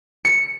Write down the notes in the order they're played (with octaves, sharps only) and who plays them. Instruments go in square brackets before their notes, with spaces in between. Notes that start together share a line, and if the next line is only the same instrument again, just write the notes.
[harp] C#7